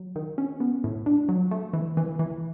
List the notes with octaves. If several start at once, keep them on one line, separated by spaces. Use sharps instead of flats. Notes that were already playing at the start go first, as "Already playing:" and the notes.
Already playing: F#3
D#3
C#4
B3
A2
D4
F#3
A3
E3
E3
E3